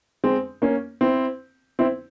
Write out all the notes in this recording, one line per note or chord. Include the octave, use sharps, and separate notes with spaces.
G#3 C4
A#3 C#4
C4 E4
C4 E4